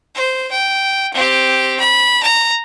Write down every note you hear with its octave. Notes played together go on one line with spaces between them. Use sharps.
C5
G5
C4 G4
B5
A#5